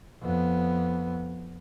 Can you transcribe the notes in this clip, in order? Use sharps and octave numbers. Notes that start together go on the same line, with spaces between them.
F2 B3